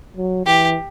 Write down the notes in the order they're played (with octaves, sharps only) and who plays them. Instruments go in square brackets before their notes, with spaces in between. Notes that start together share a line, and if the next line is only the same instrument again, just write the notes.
[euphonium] F#3
[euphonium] E3 [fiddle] G4